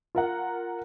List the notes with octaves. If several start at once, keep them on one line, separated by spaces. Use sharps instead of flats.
F4 A#4 F#5